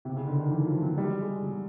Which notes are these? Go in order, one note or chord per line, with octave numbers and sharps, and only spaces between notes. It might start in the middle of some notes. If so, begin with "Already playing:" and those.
C3
C#3
D3
D#3
E3
F3
F#3
G3
G#3
F#3